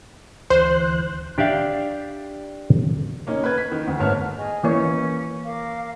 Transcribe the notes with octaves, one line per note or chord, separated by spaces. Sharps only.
D2 E3 C5 F#6
D4 G4 D5 E5 F5 G5
A#3 C#4 D#4
A#3 B4 G#6
B6
D#3
D2
G#2 A3 B3 C#5 A5 F6
G#4 D#5 G#5
E3 A#3 C#4 C#5
A#4 F5 D6